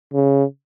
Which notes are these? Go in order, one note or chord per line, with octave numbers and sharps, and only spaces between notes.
C#3